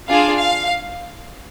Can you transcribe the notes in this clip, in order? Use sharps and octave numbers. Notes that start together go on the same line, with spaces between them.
D4 F4 G#4 F5
F5